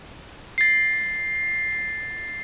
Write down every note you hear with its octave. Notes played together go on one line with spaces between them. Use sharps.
A6 C7